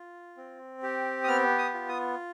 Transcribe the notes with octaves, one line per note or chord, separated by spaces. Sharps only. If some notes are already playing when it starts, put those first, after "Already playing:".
Already playing: F4
C4
G4
D#6
B3 F6
D#6
F4
D#6